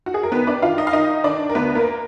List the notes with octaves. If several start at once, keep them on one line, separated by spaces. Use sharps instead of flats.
F#4
G#4
A#4
D#3 B3 B4
D4 D5
D#3 F4 F5
D#4 D#5
F5
D#3 D#4 D#5
D#3 D4 D5
A#4
D2 B3 B4
A#3 A#4